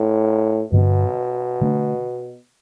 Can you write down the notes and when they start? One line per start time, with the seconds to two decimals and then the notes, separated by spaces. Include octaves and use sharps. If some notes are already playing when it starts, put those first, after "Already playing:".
Already playing: A2
0.72 G2 B2 D3 G3 B3
1.61 D3 A3 D4